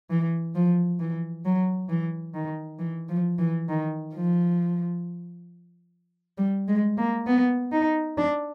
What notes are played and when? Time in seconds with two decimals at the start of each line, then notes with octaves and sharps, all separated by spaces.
0.10 E3
0.55 F3
0.99 E3
1.45 F#3
1.89 E3
2.34 D#3
2.79 E3
3.09 F3
3.39 E3
3.69 D#3
4.14 F3
6.38 G3
6.68 G#3
6.97 A#3
7.27 B3
7.72 D#4
8.17 D4